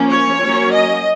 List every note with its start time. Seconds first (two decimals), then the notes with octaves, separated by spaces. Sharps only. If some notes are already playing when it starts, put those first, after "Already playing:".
Already playing: F3 A#3 C#4
0.10 C#5
0.42 F#3 A#3 C#4
0.72 D#5